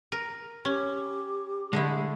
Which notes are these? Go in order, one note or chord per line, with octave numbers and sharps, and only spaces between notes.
A#4
C#4 G4
D3 G#3 A3 E4